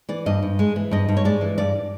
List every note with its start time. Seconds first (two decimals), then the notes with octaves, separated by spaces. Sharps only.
0.09 E3 D5
0.26 G2 D#5
0.43 G2
0.59 G#3
0.76 E3
0.91 G2 D#5
1.09 G2
1.17 C#5
1.25 G#3 D5
1.41 E3
1.58 G2 D5